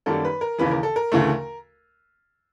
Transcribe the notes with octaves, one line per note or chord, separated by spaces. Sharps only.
F#2 D#3 G3 A#3 A4
B4
A#4
D#2 C#3 E3 B4
A#4
A4
A#4
D2 C#3 E3 A3